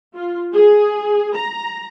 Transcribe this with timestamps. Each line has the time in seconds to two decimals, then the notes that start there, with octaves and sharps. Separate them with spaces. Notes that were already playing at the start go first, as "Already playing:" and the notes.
0.16 F4
0.54 G#4
1.36 A#5